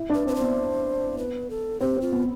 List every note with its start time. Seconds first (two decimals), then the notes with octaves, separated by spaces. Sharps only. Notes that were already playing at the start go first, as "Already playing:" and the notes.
Already playing: E4
0.10 D4 B4
0.25 C4 B4
0.35 C5
0.40 B3
1.18 B4
1.50 A4
1.81 C4 G4
1.97 C4 F4
2.12 B3